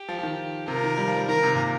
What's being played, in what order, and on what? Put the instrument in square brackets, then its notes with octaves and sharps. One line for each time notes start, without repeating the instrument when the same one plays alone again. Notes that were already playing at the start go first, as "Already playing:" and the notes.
Already playing: [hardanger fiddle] G4
[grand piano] F3
F3
D#3
[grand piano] C3 [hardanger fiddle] A#4
[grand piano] F3
D#3
G3
F3
G3
[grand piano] D#3 [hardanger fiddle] A#4
[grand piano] C3
A#2